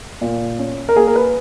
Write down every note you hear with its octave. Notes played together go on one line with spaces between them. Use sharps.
A#2
C#4
A#4
A#3 G#4
A#4
B4